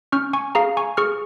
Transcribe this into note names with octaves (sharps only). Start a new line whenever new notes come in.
C#4 C#6 F6
G#5 C#6
G#4 F5 A#5
G#5 C#6
G#4 C#6 F6